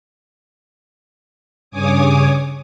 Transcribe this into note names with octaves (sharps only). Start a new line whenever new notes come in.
G2 C#3 C#5 G#5 D6 D#6